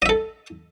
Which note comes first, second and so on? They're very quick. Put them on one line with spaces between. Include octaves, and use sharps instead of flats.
D#5 E5 A4